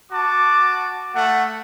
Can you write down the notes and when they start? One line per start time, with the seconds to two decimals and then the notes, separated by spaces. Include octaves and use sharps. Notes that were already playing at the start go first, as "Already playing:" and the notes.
0.12 F#4 A5 D6
1.14 A3 F#5